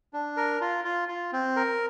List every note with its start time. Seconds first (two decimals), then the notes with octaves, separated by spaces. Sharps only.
0.13 D4
0.37 A#4
0.61 F4
0.84 F4
1.08 F4
1.33 C4
1.56 A#4